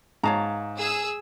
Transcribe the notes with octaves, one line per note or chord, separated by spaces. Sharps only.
G#2 C#5 F5 A5 A#5
G#4 E6